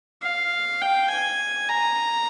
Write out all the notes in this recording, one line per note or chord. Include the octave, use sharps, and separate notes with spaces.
F5
G5
G#5
A#5